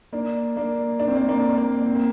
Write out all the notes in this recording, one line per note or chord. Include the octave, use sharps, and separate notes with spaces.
A#3 D4
A#3 D4
D4
C4
A#3 D4
A#3 D4
A#3 D4
C4
A#3